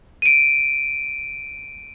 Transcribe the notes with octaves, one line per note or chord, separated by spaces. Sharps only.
D7 D#7